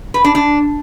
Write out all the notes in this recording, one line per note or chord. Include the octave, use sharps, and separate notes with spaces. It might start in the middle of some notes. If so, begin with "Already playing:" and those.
B4
D4
D4